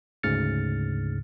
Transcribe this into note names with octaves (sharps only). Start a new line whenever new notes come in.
D2 G#2 C#3 F6 A6 C#7